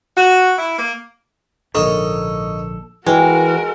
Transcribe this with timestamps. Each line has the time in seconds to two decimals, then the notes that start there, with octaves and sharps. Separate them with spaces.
0.17 F#4
0.58 E4
0.78 A#3
1.75 A#1 G#2 D3 D#4 A4 A#4 C#5
3.06 E3 G#3 F#4 A#4 G5